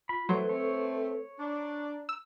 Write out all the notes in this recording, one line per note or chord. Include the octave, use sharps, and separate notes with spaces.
F4 B5
E3 F#3 A3 A4 B4 C5 C6
A3 C4 C#5
D4 A#5
E6